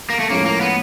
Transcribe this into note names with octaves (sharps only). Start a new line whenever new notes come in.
A#3
A3
A2 F3 G#3 A#3 C#4
A#3
B3